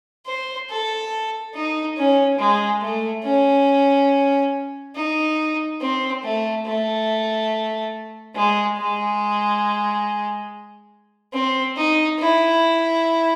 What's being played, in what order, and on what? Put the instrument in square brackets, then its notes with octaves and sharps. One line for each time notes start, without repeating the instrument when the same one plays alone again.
[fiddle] C5
A4
D#4
C#4
G#3
A3
C#4
D#4
C4
A3
A3
G#3
G#3
C4
D#4
E4